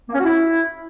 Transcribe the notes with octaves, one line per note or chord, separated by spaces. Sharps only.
A#3
C#4
F#4
E4